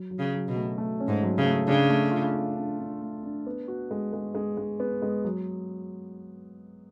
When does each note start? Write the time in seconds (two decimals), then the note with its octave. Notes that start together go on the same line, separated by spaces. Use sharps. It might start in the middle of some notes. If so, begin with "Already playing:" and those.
Already playing: F#3
0.11 F#3
0.19 C#3
0.34 F#3
0.48 B2
0.56 A3
0.78 A3
1.00 C#4
1.08 G#2
1.23 F#3
1.38 C#3
1.46 A3
1.67 C#3 D4
1.90 A3
2.12 F4
2.35 D4
2.57 D4
2.79 D4
3.02 A3
3.23 D4
3.47 B3
3.68 F#4
3.91 G#3
4.13 G#3
4.35 G#3
4.57 G#3
4.80 B3
5.02 G#3
5.24 F#3